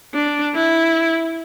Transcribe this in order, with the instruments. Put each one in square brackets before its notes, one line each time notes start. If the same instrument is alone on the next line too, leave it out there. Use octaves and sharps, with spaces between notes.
[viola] D4
E4